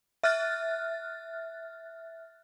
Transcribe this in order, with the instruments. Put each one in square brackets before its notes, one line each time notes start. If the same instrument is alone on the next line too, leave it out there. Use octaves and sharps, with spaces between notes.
[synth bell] E5 F6 F#6 A6